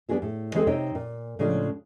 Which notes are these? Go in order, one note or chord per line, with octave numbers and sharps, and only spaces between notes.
G3 B3 D4 F#4 G#4 A4
A2
E3 G#3 C4 G#4 A4
C3 C4 D#4 C#5 D#5 G5
A#2
A2 C#3 F3 G#3 D4